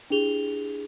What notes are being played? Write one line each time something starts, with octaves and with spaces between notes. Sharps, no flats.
D4 E4 G4 G#4 F7 G7